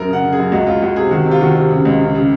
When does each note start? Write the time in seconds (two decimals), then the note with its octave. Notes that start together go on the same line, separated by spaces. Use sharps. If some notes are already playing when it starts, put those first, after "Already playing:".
Already playing: F#2 A#4
0.08 C#3 F#5
0.23 C#3
0.32 G#4
0.38 F#2
0.52 C#2 F#4
0.66 C#2 F4
0.82 C#2 F#4
0.96 C3 G#4
1.11 D#3 F#4
1.26 C3
1.31 F4
1.41 D#3 F#4
1.55 C3
1.70 C#3
1.85 C#2
2.00 C#3
2.15 C#3